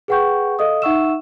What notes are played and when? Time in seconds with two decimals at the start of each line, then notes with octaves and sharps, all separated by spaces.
0.08 G#4 B4 F#5 G5 C#6 G6
0.59 A4 D#5 F5 D#6
0.82 D#4 E5 F#5 C#6 E6 E7